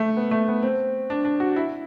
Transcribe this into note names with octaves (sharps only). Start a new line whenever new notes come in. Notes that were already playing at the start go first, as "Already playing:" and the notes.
Already playing: A3
B3
A3
B3
C4
D4
D4
F#4
E4